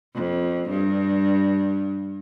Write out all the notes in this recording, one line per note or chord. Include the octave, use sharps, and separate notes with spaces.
F2
G2